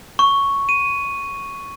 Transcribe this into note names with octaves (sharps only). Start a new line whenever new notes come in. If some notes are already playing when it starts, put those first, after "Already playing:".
C#6
D#7